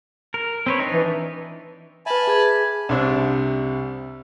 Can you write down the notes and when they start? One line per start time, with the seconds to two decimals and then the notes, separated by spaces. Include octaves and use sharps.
0.34 A#4
0.66 C4 B4 C#5
0.79 D4 D#4
0.93 E3
2.06 B4 E5 G#5 A5 B5
2.27 G#4 G#6
2.89 C2 C3 D4